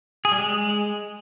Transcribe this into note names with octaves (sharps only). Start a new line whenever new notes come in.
G#4
G3
G#3